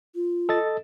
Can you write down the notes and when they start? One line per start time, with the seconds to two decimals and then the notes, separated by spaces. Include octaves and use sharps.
0.15 F4
0.49 A4 D#5 A6